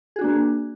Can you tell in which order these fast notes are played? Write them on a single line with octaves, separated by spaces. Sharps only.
G#4 F#4 D4 A#3